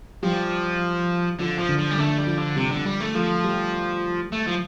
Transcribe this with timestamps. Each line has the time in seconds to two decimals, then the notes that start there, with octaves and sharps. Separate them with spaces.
0.23 F3 G3 G4
1.40 D3 F3 F4
1.59 F3
1.69 D3 D4
1.79 F3
1.91 G3
1.98 D3 A3 D4
2.18 G3
2.27 F3 F4
2.38 D3
2.56 C3 G3 G4
2.71 D3
2.86 G3
3.00 A3
3.15 F3 A3 A4
3.44 G3 G4
4.32 A3
4.47 F3